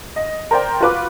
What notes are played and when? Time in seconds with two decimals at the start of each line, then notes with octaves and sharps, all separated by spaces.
0.16 D#5
0.51 A#4 C5 D5 G5
0.80 F4 F#4 B4 D6